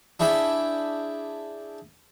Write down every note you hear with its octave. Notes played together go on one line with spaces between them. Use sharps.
D4 E4 G#4 G5 B5